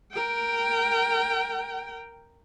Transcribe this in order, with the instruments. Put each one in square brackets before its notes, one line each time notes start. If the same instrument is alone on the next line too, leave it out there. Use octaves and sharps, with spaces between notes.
[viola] A#4 G5